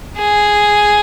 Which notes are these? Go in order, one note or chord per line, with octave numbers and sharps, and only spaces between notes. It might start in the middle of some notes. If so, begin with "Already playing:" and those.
G#4